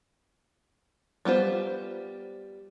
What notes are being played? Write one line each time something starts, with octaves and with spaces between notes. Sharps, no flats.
G3 B3 F4 C5